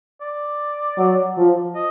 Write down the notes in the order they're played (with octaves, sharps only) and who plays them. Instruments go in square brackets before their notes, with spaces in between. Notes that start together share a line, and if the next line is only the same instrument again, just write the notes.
[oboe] D5
[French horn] F#3
F3
[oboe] D#5